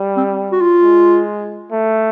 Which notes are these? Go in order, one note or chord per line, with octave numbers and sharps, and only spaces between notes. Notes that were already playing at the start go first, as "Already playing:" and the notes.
Already playing: G3
C4
F#4
F4
G#3
A3